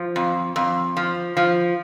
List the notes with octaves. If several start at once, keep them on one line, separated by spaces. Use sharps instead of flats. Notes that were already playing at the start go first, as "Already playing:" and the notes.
Already playing: F3
F2
F2
F3
F3